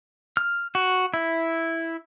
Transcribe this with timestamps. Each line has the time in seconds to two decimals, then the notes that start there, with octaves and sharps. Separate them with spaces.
0.37 F6
0.75 F#4
1.14 E4